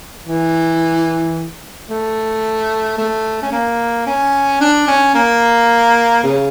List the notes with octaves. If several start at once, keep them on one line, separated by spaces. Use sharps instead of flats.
E3
A3
A3
C#4
A#3
C#4
D4
C#4
A#3
C#3